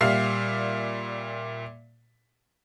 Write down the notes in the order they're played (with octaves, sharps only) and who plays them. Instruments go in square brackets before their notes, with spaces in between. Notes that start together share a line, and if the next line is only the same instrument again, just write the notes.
[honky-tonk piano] A#2 G3 E5 F5 F6 C7